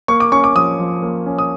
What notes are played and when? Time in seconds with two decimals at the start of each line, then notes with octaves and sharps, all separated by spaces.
0.08 A#3 C#6
0.20 D6
0.32 C#4 C#6
0.44 D6
0.55 F3 D#6
0.79 F3
1.02 A#3
1.26 C#4
1.39 D#6